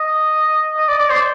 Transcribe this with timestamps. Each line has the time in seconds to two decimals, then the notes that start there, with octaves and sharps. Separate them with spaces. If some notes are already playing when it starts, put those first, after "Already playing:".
Already playing: D#5
0.77 D#5
0.88 D5
0.99 D5
1.10 C5